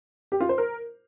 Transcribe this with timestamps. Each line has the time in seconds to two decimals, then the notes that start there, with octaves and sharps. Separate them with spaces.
0.32 G4
0.41 F4
0.49 C5
0.58 A#4